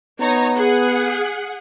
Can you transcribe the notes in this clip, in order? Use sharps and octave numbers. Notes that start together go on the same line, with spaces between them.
B3 D#4 C#5 A#5
G#4 F#5